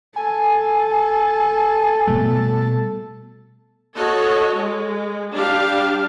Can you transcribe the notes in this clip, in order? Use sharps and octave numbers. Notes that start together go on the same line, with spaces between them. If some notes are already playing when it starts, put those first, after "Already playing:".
A4 G#5
B2 G3 A3
F#4 A4 C#5 D#5
G#3
G3 D4 G4 F5